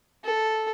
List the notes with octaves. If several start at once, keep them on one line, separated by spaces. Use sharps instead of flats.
A4